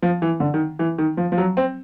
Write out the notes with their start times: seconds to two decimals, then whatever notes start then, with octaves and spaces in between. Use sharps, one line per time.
0.02 F3
0.22 E3
0.40 D3
0.54 D#3
0.79 E3
0.98 D#3
1.17 F3
1.32 F3
1.38 F#3
1.57 C4